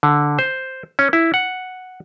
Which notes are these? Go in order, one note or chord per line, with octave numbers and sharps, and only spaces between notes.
D3
C5
C#4
E4
F#5